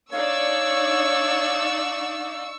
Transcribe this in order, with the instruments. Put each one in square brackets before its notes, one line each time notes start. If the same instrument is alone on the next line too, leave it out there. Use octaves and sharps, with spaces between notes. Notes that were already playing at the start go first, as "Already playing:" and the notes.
[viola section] D4 D#4 D5 [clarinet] C#5 [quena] F5 [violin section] C#6 E6